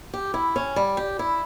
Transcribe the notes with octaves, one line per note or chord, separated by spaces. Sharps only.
G4
E4
C#4
G3
G4
E4